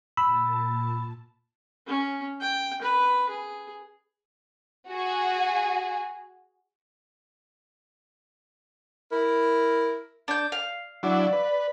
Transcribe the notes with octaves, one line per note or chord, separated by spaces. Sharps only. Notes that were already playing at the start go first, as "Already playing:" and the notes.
A#2 A5 B5 E6
C#4
G5
B4
G#4
F#4 G#4
E4 A#4
D4 G6
F5
F#3 D4 E4 D5
B4